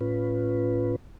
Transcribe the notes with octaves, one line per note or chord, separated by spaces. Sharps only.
A2 C#4 F4 B4